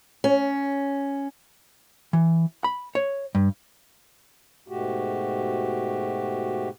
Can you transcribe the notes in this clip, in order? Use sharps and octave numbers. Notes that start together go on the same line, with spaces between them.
C#4
E3
B5
C#5
G2
G#2 B2 A3 F#4 G4